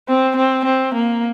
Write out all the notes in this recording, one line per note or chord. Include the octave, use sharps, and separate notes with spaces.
C4
C4
C4
A#3